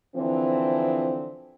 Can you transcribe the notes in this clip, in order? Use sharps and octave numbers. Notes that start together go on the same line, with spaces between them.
D3 E3 F3 C4